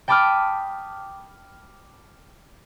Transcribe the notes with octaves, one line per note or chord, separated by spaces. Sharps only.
G5 A5 B5 D6 D#6 F6